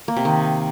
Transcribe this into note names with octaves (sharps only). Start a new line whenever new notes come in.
A#3
C3
D#3